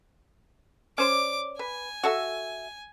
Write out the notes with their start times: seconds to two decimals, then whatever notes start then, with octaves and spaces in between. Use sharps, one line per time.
0.98 C#4 C5 D5 D6
1.59 B4 G#5
2.03 F#4 A4 E5